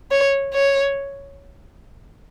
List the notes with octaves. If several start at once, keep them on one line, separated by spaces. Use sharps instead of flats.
C#5
C#5